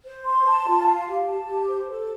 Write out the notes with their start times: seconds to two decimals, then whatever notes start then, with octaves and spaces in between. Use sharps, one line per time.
0.05 C5
0.25 C6
0.46 A5
0.67 F4
0.87 F5
1.08 G4
1.28 A5
1.48 G4
1.68 C5
1.89 A4